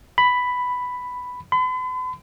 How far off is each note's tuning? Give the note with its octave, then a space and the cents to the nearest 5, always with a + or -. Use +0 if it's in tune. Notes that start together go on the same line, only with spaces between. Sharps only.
B5 +5
B5 +45